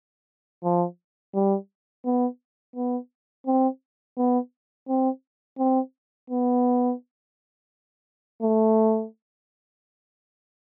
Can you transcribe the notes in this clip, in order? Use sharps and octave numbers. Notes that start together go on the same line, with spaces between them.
F3
G3
B3
B3
C4
B3
C4
C4
B3
A3